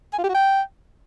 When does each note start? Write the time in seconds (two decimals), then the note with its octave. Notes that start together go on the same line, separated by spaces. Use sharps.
0.13 G#5
0.18 F4
0.24 G4
0.29 F#4
0.34 G5